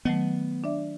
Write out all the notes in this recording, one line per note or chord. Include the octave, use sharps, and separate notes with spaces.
D#3 F#3 A3 B3
D4 D5 E5